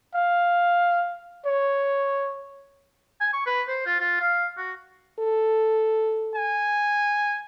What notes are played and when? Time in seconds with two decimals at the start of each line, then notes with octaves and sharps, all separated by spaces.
0.15 F5
1.46 C#5
3.20 G#5
3.33 C#6
3.46 B4
3.68 C5
3.86 F4
4.00 F4
4.20 F5
4.58 F#4
5.19 A4
6.36 G#5